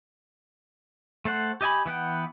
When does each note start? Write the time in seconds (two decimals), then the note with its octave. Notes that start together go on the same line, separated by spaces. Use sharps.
1.25 A3 A4 C5 F#5
1.61 G4 D#5 G#5 B5
1.86 E3 B3 F#5 G5